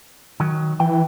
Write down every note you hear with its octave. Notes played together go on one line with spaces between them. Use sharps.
D#3 F#3
E3 G5